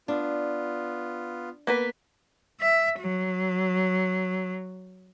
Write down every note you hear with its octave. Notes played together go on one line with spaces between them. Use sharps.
B3 D4 F4
A#3 B3 B4
E5
F#3